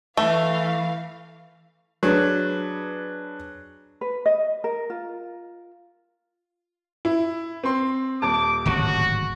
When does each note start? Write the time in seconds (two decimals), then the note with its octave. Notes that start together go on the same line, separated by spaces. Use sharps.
0.17 E3 A3 F5
2.03 F#3 D4 G#4 B4
4.01 B4
4.26 D#5
4.64 A#4
4.90 F4
7.05 E4
7.63 C4 C6
8.22 D#1 A5 D6
8.66 D1 G#1 C#3 F#4